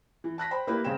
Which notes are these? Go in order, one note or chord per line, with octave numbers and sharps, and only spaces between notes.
E3
A5 F#6 A#6 B6
C5 G5 B5
A#3 E4 G4 B4
C#3 G#3 C4 F5 G5 E7